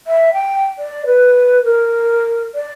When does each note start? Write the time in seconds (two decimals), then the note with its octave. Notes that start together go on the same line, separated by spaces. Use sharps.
0.07 E5
0.33 G5
0.78 D5
1.06 B4
1.64 A#4
2.54 D5